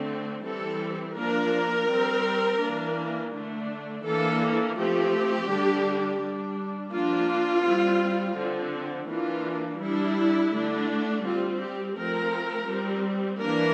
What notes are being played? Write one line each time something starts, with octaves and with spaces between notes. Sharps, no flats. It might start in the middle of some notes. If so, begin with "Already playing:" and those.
Already playing: D3 A3 C4
E3 G3 C4 A4
F3 A#3 D4 A#4
G3 C4
E3 A#3 D4
D3 A3 D4
E3 A#3 D4 A4
F3 A3 C4 G4
D3 G3 D4
G3 D4
F3 A#3 D4 F4
G3 C4
D3 F3 C4
E3 A#3 D4 F4
G3 D4 E4
D3 A3 D4
G3 C4 F4
G4
F3 A3 C4 A#4
G3 C4
E3 A#3 D4 A#4